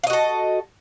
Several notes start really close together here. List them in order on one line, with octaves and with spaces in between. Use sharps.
F5 D#5 F#4 A4